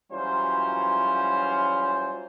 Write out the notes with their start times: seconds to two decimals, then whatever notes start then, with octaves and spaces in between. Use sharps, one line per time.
0.11 E3 F#3 G3 C#4 F4 C5